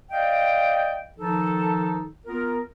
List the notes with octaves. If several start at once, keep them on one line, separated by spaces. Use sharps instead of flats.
D5 D#5 F5 G5
D#3 F3 D#4 A4
B3 F4 A#4